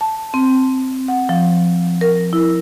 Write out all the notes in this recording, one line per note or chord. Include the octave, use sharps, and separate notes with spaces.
A5
C4
F#5
F3
A#4
E4